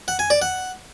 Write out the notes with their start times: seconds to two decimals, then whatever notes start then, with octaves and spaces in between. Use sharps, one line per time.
0.08 F#5
0.19 G#5
0.30 D5
0.42 F#5